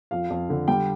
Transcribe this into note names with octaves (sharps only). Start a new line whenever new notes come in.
F2 F5
F2
D3
G3 G5